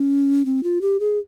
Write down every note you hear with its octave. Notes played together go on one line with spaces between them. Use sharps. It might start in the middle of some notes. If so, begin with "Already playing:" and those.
Already playing: C#4
C4
F4
G4
G#4